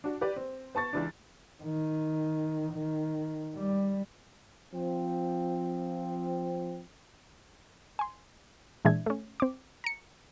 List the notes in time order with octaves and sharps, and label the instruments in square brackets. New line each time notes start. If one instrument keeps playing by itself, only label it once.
[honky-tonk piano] D4 F#4
G4 B4 D5
C4
B3 A5 C#6 A6
C#2 E3 D4
[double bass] D#3
D#3
G3
[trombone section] F3 C4
[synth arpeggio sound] G#5 C6
A#2 E3 G#3 D4 E5 G#6
A3 C#4
C4 D6
A#5 C#7